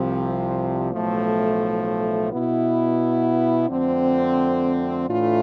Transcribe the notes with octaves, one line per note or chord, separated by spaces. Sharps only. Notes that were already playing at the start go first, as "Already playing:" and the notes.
Already playing: C2 C3 F3
B1 A2 F3 A3
B2 B3 E4
F2 D3 A3 C4
A2 E3 A3 D4 F4